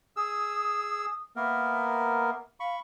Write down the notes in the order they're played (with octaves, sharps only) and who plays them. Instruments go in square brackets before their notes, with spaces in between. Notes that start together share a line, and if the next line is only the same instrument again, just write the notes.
[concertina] G#4 E6 [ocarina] D#6
[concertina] A#3 B3 A#4 [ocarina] E5
[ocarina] F5 [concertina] B5 C#6